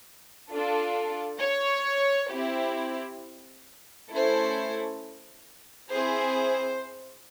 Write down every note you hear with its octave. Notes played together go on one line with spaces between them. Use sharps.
D4 F4 A4
C#5
C4 E4 G4
A3 C#4 E4 A4 C5
C4 E4 G#4 C5